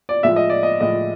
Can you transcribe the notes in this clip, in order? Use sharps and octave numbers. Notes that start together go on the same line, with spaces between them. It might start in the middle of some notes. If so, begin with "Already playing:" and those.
D5
A2 F3 G#3 E5
D#5
D5
D#5
A2 F3 G#3 D#5